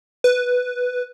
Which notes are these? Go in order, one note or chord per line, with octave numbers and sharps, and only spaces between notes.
B4